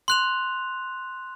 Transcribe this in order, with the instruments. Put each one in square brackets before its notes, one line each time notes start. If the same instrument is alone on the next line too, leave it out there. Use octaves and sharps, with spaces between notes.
[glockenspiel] C6 F#6 F7